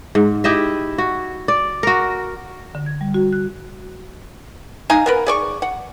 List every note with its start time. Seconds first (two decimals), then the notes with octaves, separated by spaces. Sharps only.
0.15 G#2
0.44 E4 G4 D#5 E5
0.98 F#4
1.48 D5
1.83 F#4 A#4
2.75 D3
2.86 G#6
3.01 G3
3.14 F#4
3.33 F#6
4.90 D#4 F5 G#5 A#5
5.06 B3 A#4 B4
5.26 G#4 D5 C#6
5.62 F#5